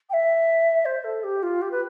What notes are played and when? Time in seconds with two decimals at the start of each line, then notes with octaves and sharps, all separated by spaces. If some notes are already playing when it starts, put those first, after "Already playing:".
0.09 G5
0.13 E5
0.85 C5
1.04 A4
1.23 G4
1.42 F4
1.61 G4
1.71 B4